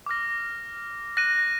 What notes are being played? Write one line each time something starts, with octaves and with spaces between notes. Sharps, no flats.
D6 F6 A#6
F#6 A#6 D#7